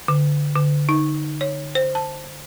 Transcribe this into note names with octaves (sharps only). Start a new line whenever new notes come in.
D3
D3
D#4
C#5
C5
A5